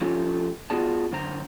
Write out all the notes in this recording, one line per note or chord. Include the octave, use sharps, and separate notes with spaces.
F3 A3 C#4 F4 G4 A4
B3 F4 F#4 G#4 D5 A5
F#2 D3 C5 A#5